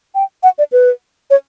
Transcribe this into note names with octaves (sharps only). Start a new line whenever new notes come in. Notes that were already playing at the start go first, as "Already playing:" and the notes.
G5
F#5
D5
B4
C#5